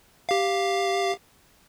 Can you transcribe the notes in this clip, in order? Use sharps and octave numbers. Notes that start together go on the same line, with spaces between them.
G4 F5